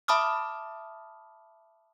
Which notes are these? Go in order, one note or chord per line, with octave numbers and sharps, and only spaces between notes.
E5 A5 B5 D6 D#6 F6